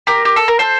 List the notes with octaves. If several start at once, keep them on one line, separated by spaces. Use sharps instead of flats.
G4 A#4
G4
A4
A#4
A4 C5